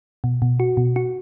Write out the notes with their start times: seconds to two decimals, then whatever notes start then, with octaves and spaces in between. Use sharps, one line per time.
0.24 B2
0.42 B2
0.60 F#4
0.77 B2
0.96 F#4